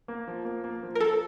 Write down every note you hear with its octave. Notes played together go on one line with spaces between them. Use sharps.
A#3
F3
A#3
A#3
F3
A#4
F3 A4